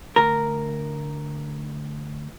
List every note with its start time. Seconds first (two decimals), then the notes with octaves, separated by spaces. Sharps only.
0.16 D2 A#4